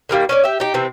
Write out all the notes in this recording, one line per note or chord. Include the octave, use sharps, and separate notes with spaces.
D3 D#3 G3 A#3
C#4 C#5 D5
G4 E5
D#4 G4
C3 E3 C4